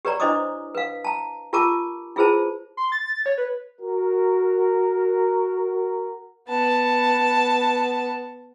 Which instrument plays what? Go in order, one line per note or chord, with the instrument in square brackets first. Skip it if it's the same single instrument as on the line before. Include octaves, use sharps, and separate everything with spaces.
[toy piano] G4 B4 C#5 D5 A#5
D4 E4 C5 D#5 D6 D#6
B4 F5
A5 A#5
F4 G4 A#4 A5 A#5 D6
E4 F4 G#4 B4 C5 A5
[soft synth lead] C6
A6
C#5
B4
[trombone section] F#4 A#4
[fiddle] B3 A5